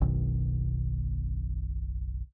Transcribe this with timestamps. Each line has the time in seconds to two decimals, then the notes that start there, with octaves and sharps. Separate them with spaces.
0.01 F#1 B1 B2 D#3